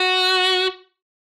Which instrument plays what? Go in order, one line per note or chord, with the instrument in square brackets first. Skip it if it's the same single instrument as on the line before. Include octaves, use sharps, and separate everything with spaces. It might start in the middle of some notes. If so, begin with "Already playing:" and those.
Already playing: [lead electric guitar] F#4